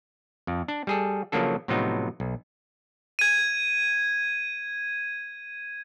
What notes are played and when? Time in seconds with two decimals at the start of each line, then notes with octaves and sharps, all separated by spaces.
0.47 F2
0.68 D4
0.87 G3 G#4 A4
1.32 C#3 F3 F#3 A#3 D4 A4
1.68 A2 C3 F3 F#3 B3 D#4
2.20 B1
3.19 G#6 D#7